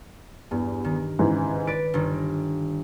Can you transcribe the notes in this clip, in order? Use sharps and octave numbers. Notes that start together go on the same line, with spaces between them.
E2 G2
D#3
G#2 C#3 E3
B4 D5 D7
G1 D#3